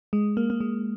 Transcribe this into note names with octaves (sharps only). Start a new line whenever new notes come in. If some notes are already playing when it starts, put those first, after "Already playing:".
G#3
A#3
A#3
G#3